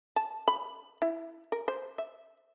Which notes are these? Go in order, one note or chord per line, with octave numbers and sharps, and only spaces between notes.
A5
B5
E4
A#4
C5
E5